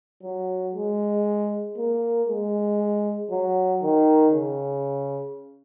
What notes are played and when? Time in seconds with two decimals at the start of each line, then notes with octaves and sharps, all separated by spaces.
0.23 F#3
0.75 G#3
1.77 A#3
2.28 G#3
3.31 F#3
3.82 D#3
4.33 C#3